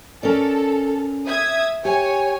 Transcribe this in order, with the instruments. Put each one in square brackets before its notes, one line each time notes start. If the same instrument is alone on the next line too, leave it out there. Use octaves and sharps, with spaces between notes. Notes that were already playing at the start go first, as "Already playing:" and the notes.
[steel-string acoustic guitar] C#4 A#4 D5 [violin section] A4
[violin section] E5 D#6 G#6
[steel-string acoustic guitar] G4 [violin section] C#5 G#5